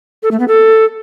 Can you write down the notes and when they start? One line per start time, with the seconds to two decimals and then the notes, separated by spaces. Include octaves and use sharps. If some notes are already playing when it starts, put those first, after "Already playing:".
0.23 A4
0.31 A3
0.40 B3
0.48 A4